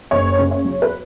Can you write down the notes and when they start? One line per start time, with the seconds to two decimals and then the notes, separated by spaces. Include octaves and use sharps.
0.11 F#1 C#5
0.39 C#3
0.51 C#5
0.65 F#3
0.82 B4